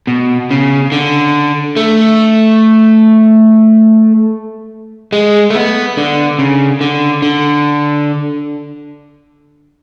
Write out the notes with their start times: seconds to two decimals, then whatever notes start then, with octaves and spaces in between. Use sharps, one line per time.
0.07 B2
0.51 C#3
0.92 D3
1.76 A3
5.12 G#3
5.50 A3
5.55 B3
5.97 D3
6.39 C#3
6.81 D3
7.22 D3